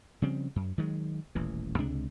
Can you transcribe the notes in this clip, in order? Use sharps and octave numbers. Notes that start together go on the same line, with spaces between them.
C#3 F3 G3 C4
F#2
D#3 F#3 G#3
D#1 A1 E3
C#2 C3 G#3 D4